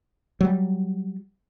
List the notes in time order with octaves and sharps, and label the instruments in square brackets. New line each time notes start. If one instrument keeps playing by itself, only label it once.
[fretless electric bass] F#3 G3